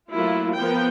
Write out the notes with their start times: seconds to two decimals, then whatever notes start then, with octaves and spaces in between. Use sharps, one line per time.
0.12 F#3 A3 A#3 E4 F4
0.58 F3 B3 A#4 G5